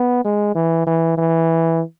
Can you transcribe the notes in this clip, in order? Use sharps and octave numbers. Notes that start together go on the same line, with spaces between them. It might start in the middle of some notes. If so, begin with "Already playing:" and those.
Already playing: B3
G#3
E3
E3
E3